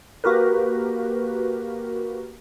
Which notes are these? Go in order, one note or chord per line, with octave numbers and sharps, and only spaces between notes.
A#3 F#4 G4 A#4 B4